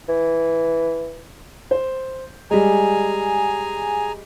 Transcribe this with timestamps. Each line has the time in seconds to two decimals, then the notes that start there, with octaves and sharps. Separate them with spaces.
0.08 E3
1.71 C5
2.51 G3 G#3 G#4 G#5 A#5